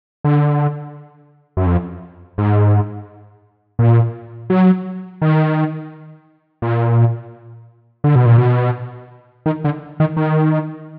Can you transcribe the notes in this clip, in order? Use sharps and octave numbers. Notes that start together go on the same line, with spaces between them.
D3
F#2
F2
G#2
A#2
F#3
D#3
A#2
D3
B2
A#2
B2
D#3
D3
D#3
D#3